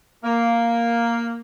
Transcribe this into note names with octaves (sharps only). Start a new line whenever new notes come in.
A#3